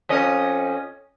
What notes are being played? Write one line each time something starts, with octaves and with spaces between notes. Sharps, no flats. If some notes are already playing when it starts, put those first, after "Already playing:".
F2 C#4 D#5